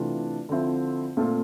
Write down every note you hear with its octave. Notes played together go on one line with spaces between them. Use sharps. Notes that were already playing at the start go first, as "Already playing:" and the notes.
Already playing: C3 E3 A3 D4 F4
D3 F3 C4 E4
A#2 A3 C4 F4 A4